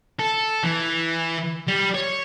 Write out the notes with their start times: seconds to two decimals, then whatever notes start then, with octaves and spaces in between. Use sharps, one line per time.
0.19 A4
0.63 E3
1.68 G3
1.95 C#5